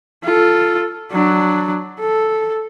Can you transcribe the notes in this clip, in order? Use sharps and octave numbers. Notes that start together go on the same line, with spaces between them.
F4 A4
F#3 D4
A4